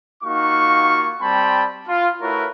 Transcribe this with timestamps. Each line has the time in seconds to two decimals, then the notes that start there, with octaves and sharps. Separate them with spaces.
0.23 A#3 D#4 F4 F#4 F5 C#6
1.21 G3 C4 G5 A5 B5 C6
1.88 F4
2.22 A3 E4 F#4 A#4 B4 C#5